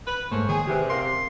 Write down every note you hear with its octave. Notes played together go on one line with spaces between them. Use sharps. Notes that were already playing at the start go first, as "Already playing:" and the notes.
B4
G#2 A3 A#3 C5 C#5
D#3 G#4 G#5
E2 C3 G4 B4
A#4 F5 C6